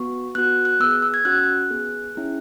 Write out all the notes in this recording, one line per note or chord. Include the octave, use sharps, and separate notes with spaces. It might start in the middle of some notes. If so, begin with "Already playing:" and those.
Already playing: B3 F#4 C#6
B3 F#4 F#6
F#6
B3 G#4 E6
E6
E6
G#6
C#4 F#4 F#6
B3 G#4
C#4 E4 G#4